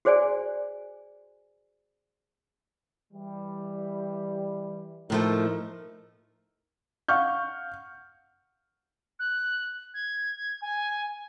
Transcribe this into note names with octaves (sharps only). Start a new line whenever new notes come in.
F#4 G#4 C5 D5 G#5
E3 G3
A2 F3 A3 D#4 A#4
F5 F#5 C#6 F6 G6
F#6
G#6
G#5